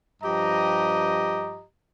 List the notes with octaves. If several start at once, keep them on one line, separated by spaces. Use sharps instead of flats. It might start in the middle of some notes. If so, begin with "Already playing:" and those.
G2 F3 G4 D#5 A#5